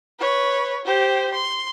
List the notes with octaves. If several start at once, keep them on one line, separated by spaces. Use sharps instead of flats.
B4 C#5
G4 C5
C6